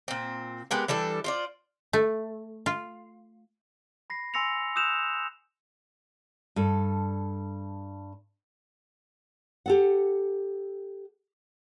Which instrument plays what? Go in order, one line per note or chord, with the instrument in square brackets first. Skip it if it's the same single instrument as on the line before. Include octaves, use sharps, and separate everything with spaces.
[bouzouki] A#2 C4
G#3 B3 G4 A#4
E3 G3 D4 A4
F4 C5 D5
[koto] A3
F4
[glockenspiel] B5 A#6 C7
G#5 C6 E6 A#6 C#7 F7
D#6 E6 F#6 G6 E7 F7
[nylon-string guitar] G2 A4
G4 A4 F#5